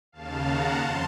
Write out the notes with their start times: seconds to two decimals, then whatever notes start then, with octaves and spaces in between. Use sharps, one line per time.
0.12 D#2 C#3 F5 A5
0.44 F#5 A#5
0.75 F2 A5 C6